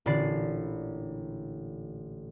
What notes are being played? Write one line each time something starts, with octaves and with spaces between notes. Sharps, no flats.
A1 A#2 D3 D5 B5 C7